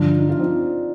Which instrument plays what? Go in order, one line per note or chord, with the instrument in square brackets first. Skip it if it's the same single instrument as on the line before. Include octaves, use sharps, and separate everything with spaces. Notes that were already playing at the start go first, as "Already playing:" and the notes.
Already playing: [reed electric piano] G2 D3 F3 [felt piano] D4 F4
[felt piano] D#4
F4
C4 D#4